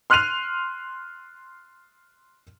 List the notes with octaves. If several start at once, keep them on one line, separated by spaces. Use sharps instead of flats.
C6 F6 F#6 C7 D#7 F7